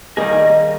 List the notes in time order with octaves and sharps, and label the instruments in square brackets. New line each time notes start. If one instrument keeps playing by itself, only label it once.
[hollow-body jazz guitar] D#3 G3 A#3 D#4 G#4 [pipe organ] D#5